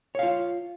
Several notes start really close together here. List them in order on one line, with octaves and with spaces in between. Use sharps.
C#5 F5 F4